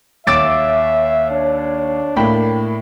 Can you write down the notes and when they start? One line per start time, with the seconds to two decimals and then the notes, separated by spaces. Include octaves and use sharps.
0.27 D#2 C#5 E5 D6 E6 A6 D7
1.31 D4
2.16 A2 A#3 G5 B5